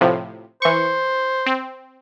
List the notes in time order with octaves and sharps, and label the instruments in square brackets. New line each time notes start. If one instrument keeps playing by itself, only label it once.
[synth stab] A2 C3 F3
[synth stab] E3 C#6 [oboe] C5
[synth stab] C4